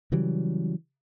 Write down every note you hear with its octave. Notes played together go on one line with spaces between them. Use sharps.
C#3 E3 F#3 G3